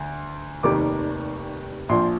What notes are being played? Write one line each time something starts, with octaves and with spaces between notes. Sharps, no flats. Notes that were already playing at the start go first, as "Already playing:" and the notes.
Already playing: D2
F1 D#2 D#3 G3 D6
A#1 A#2 F3 C6